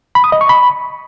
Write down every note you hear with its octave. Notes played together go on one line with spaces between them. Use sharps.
B5
D#6
D#5
C#6
B5